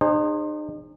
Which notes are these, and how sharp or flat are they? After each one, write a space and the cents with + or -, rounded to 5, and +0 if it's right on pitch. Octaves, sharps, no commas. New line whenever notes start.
D#4 -40 G#4 -25 C5 +25